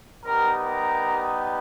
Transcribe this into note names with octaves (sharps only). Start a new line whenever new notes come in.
G3 B3 D#4 G4 A#4
A#4